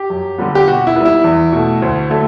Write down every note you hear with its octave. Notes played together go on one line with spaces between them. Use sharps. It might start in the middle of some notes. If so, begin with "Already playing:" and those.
Already playing: G4
F#2
D3 G3 B3
G4
B2 F#4
E4
G3 B3
E4
E2
B2 A3
D2
D3 F#3 A3